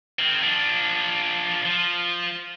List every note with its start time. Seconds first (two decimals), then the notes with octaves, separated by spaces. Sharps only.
0.19 D#3 C4
0.43 F3 D4
1.65 F3